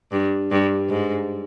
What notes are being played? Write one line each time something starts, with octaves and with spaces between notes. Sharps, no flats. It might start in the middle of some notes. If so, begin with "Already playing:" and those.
G2
G2
G#2